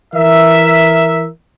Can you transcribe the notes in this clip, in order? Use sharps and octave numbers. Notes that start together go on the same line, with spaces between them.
E3 A#4 E5